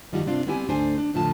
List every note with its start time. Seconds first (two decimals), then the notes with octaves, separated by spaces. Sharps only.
0.12 F#2 D#3 F3 G3 F4 F#4
0.26 G2 C3 C4 D4 F4
0.46 G3 B3 C4 E4 G4 G#5
0.67 D2 G#2 A3 D4 C5 G#5
0.98 D4
1.14 F2 A2 D3 F3 F4 A5